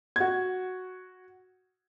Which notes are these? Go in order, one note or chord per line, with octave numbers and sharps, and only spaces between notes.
F#4 G#6